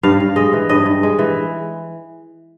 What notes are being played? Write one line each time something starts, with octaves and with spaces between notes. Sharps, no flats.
G2 F5
G2
G#3 D#5
E3
G2 D#5
G2
G#3
E3